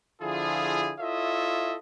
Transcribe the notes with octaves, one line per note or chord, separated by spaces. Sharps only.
D3 F3 E4 F4 G#4
E4 F4 A4 C#5 D#5 E5